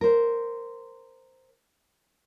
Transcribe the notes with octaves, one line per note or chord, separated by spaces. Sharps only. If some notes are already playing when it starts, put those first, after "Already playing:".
A#4 C5